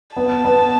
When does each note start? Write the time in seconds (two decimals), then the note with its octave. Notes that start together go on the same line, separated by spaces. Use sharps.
0.17 B3 A5
0.45 B3